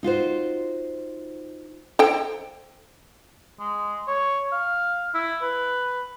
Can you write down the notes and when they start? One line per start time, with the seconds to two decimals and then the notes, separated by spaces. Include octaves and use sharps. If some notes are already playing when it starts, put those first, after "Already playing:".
0.03 D#4 F4 F#4 C5
1.99 A4 C5 G5
3.60 G#3
4.08 C#5
4.52 F5
5.15 E4
5.42 B4